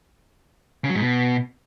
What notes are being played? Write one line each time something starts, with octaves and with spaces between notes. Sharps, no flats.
C#3
F#3
G#2
B2